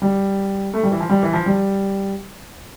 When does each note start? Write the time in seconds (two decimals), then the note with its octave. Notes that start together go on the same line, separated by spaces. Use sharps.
0.02 G3
0.74 A3
0.83 G3
0.91 E3
1.00 F3
1.09 G3
1.23 E3
1.33 F3
1.46 G3